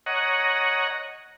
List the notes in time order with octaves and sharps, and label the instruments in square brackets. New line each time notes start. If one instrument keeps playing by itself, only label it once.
[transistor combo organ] C#5 D#5 F#5 A#5